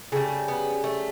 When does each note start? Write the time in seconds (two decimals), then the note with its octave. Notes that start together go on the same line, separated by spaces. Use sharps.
0.12 C#3 G3 A3
0.48 B3
0.84 A3